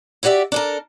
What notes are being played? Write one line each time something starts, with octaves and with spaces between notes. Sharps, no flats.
E4 F#4 G4 D5 E5
D4 A4 A#4